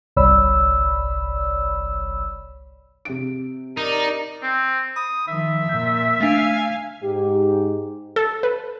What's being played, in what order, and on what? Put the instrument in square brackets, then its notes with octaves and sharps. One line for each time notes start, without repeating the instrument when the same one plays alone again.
[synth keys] G1 C2 C#5 D5 B5 E6
[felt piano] C3 D7
[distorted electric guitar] D#4 [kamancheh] A#4 D5
[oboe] C4
[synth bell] B5 [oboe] D#6
[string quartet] D#3 F3 [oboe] E5
[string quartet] A#2 [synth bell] G6
[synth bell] A3 D4 [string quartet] F5 G#5
[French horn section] G#2 G4
[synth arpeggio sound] A4
B4